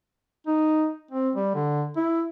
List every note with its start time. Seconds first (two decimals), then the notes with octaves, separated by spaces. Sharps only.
0.47 D#4
1.11 C4
1.35 G3
1.55 D3
1.96 E4